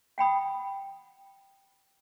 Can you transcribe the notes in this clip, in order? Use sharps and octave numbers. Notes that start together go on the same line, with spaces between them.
F#5 G5 B5 D#6